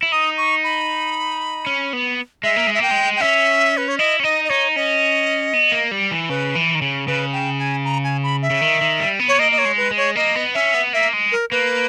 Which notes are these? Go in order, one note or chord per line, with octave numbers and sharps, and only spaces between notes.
E4
D#4 D#6
C#6
B5
C#4
B3
G#3 E5
A#3
G#3
E5
A#3 G5
G#3
G5
C#4 E5
B4
C#5
E4 D#5
C#4
D#4 D#5
D#5
D#4 C#5
C#4 D#5
B3
A#3
G3
E3
C#3 B4
E3
D#3
C#3
C#3 B4
G5
G#5
A#5
G#5
B5
E5
C#3
D#3
D#3
G3
B3
C#5
A#3 D#5
D#5
C#5
G#3
B4
G#3
C#5
A#3 D#5
B3
C#4 E5
B3
A#3 E5
G#3
A#4
A#3 B4